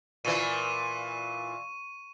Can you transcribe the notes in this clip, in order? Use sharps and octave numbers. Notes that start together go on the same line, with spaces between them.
A#2 E3 C#6 D#7